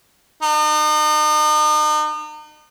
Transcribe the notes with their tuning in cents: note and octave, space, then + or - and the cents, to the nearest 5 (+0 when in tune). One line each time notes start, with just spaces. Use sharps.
D#4 -40